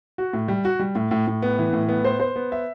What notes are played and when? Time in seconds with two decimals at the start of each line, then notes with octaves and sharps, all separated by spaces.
0.18 F#4
0.33 A2
0.48 G3
0.65 F#4
0.79 G3
0.95 A2
1.11 A2
1.27 A2
1.42 B3
1.59 E3
1.73 A2
1.89 B3
2.05 C5
2.20 C5
2.36 B3
2.52 E5